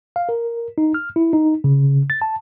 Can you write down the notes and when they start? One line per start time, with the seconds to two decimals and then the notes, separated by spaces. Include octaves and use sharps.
0.16 F5
0.29 A#4
0.78 D#4
0.94 F6
1.16 E4
1.33 D#4
1.64 C#3
2.10 A6
2.22 A5